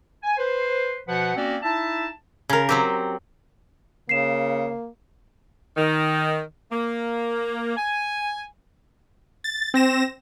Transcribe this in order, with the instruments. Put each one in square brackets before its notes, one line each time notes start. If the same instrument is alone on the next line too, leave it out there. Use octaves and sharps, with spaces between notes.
[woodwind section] G#5
B4 C5
B2 F3 B4 F#5
A#3 C4 C#4 F#4 D5
D#4 E4 E5 A5
[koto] C#3 A#4
F#3 C4 G4
[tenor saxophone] C#3 [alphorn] A#3 [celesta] C7 E7
[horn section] D#3
A#3
G#5
[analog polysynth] A6
C4 A#6 E7